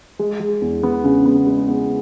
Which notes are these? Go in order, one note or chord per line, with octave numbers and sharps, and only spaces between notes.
G#3
G#3
E2
B3
C#3
B3
G#3
B3